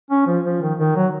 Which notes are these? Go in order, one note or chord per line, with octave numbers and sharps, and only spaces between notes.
C#4
F3
F3
D#3
D#3
F#3